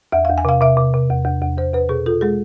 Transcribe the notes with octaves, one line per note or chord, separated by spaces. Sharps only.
E2 E5
F5
E2
G#5
C3 F5
C3 E5
C3
C3
E2
E2
E2
E2 C5
E2 B4
B2 G#4
F4 A4
G#3 G#4